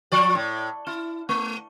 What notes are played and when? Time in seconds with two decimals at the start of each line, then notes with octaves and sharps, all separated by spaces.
0.12 F3 D5
0.35 A2
0.87 E4
1.29 A3